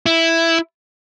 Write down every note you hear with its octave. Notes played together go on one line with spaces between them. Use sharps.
E4